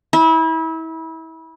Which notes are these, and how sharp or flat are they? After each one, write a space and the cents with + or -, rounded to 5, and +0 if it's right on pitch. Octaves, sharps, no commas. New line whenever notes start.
E4 -30